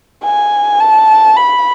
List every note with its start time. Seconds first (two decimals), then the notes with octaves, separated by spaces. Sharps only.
0.24 G#5
0.80 A5
1.36 B5